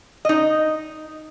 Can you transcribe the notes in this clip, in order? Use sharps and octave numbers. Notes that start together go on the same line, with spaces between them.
D#4 D#5